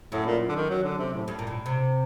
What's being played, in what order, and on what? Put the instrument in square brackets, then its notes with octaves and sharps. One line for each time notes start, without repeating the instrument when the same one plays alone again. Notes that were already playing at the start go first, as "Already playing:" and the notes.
[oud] F#2 [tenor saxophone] A2
[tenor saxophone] A#2
D3
D#3
F#3
D3
C3
A2
[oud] G2
A#2
A2
C3